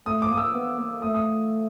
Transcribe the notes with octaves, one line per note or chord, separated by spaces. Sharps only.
A3 D#6
D6
A#3 D#6
E6
B3
A#3
A3 D#6
D#6